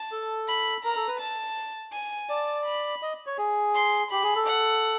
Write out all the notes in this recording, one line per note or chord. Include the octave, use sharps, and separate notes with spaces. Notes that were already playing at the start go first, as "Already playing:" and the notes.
Already playing: A5
A4
B5
A#4 A#5
A4
B4
A5
G#5
D5 A5
B5
D#5
C#5
G#4
C6
G4 B5
G#4
A4
F#5